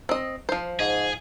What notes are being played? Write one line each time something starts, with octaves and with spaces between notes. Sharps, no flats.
C4 D#5
F3 C5
G#2 G#4